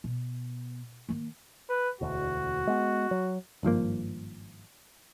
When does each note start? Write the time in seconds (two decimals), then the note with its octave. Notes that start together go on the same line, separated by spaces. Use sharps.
0.04 B2
1.09 D#3 A#3
1.69 B4
2.01 E1 D2 F#4
2.67 G#3 B3
3.11 F#3
3.63 G#1 G2 F3 A#3